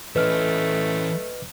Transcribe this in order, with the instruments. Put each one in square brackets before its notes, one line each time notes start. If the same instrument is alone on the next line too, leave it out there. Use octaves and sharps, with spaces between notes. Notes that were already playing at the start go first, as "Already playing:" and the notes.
[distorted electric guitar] E3 C#4 [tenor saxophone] A3 [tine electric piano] B4 D#5 F6